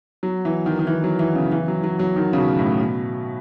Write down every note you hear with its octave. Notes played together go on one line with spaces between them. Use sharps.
F#3
E3
D#3
D#3
E3
F#3
E3
C#3
E3
F#3
F#3
F#3
D#3
C#3
B2
A2
B2